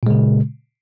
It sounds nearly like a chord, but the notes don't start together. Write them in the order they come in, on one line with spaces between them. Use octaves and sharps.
A#2 G#3 C#3